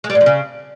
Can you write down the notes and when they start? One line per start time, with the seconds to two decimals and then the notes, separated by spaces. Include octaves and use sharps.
0.04 G#3
0.10 G3
0.15 G#2
0.21 F2
0.26 C#3